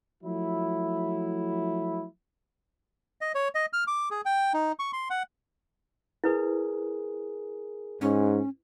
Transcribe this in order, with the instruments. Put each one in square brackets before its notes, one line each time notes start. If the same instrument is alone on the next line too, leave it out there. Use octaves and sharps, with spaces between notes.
[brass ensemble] F3 F#3 A3 E4
[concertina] D#5
C#5
D#5
F6
D6
G#4
G5
D#4
C#6
C6
F#5
[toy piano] E4 B4 [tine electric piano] G#4 A#4
[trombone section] G#2 [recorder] C#4